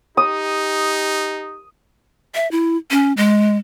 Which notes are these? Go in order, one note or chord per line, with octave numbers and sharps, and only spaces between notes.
D#4 G4 D#6
E5
E4
C#4
G#3